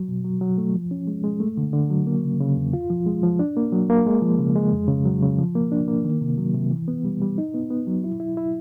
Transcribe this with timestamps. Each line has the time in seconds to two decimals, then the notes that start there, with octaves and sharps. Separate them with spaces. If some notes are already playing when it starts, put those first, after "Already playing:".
Already playing: F#3
0.08 B2
0.24 F#3
0.41 F#3
0.58 A3
0.74 F3
0.91 C#4
1.07 G#3
1.24 G#3
1.40 A3
1.57 D3
1.73 D3
1.90 F#3
2.07 A#3
2.24 C#3
2.41 C#3
2.57 E2
2.73 F4
2.90 F3
3.06 G#3
3.23 F3
3.39 D4
3.57 A#3
3.73 F#3
3.90 A#3
4.06 G#3
4.22 F3
4.39 C#3
4.56 G#3
4.73 F2
4.88 C#3
5.05 F#3
5.23 C#3
5.38 F3
5.55 A#3
5.72 D4
5.88 A#3
6.05 D#3
6.21 C3
6.38 F#3
6.54 C3
6.71 E3
6.88 B3
7.05 G3
7.21 G3
7.38 D#4
7.54 B3
7.70 B3
7.87 F#3
8.04 E4
8.20 E4
8.37 E4